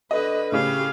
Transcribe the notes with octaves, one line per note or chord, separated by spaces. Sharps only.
D3 B4 D#5
A2 C#3 G4 F5